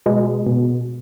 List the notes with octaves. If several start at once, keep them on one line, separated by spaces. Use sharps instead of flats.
B2 G#3
B2